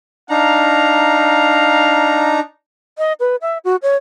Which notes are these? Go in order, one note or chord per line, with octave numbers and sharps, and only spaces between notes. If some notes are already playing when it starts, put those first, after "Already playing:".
D4 D#4 F5 A#5
D#5
B4
E5
F#4
C#5